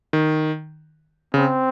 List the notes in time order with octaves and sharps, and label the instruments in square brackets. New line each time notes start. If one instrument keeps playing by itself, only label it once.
[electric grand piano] D#3
[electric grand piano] C#3 [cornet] C4